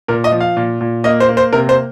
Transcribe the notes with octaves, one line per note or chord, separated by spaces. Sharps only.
A#2 A#4
D#5
F3
F5
A#2
A#2
A#3 D#5
C5
A#3
C5
C3 A#4
C5